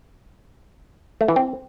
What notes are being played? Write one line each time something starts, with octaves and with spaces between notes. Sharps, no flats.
A3
E3
C4